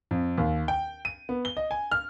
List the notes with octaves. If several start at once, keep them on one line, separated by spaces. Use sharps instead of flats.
F2
D#2
G5
D#7
B3
G7
D#5
G#5
F6